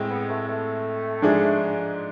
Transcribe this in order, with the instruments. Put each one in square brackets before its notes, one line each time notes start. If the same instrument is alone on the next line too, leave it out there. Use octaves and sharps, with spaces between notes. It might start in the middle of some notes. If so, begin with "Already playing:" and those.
Already playing: [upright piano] A2 G#3 C4 E4
[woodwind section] B3
A3
A3
[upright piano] G#2 F3 G#3 D4 G#4